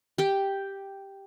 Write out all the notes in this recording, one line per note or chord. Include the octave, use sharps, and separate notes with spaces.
G4 G5